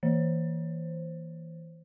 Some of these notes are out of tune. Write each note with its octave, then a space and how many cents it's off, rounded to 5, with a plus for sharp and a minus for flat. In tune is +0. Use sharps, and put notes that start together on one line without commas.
E3 -10 C5 +0